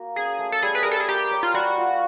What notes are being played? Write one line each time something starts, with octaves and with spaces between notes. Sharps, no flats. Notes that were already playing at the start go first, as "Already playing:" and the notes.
Already playing: A#3 F#4
C#4 G#4
A3
A4
G3 G#4
B4
G3 A#4
A4
G#4
G4 A#4
C#5
F4
G3 F#4
F4